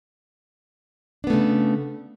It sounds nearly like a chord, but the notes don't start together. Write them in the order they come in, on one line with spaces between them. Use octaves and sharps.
D4 B3 A3 C#3